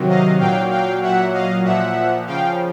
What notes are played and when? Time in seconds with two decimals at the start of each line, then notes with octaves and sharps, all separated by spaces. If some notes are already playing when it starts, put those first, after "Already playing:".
Already playing: C3 D#3 F#3
0.09 D#5 F5
0.40 A#2 F#3 F5 G5
0.71 F5 G5
1.02 A#2 F#3 E5 F#5
1.33 D#5 F5
1.65 A#2 F3 E5 F#5
2.27 C#3 F3 F5 G5